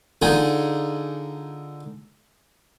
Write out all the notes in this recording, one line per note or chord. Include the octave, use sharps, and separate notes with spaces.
D3 D#4 F4 G#4